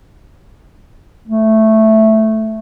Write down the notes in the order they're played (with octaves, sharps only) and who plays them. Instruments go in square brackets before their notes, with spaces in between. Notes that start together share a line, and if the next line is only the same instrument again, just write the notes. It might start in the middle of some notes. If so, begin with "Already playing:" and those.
[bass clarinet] A3